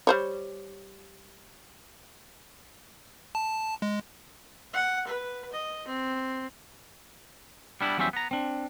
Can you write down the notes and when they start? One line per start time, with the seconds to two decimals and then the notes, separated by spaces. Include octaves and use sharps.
0.07 G3 C5 C#5
3.35 A5
3.82 G#3
4.73 F#5
5.07 B4
5.52 D#5
5.87 C4
7.81 G3 B3 D4 E4
7.98 E2 F#3 G3 C#4 C5 E5
8.13 B3 A#5
8.31 C4 D4